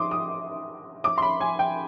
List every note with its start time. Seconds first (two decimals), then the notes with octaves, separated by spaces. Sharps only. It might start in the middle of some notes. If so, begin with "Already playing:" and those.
Already playing: C6 D6 D#6
0.11 D#6
1.04 D6
1.18 C6
1.22 B5
1.41 G#5
1.59 G5